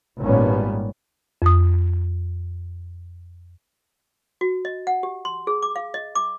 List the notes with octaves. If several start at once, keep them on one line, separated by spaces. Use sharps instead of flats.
G#1 A#2 G3 A#3 B3 C#4
F2 D#6
F#4
D#5
F#5
G4
C6
G#4
D6
F5
D#5
D6